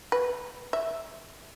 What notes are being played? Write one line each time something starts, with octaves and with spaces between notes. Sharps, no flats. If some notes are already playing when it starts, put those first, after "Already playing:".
B4
E5